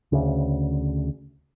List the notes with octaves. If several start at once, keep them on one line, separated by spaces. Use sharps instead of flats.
D2 C#3